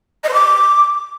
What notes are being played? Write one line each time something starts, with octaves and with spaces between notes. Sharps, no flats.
D#5
C5
D6